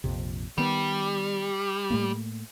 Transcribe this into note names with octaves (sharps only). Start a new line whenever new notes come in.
A#1 F2 C3
D#3 G3 B3
A2 A3 A#3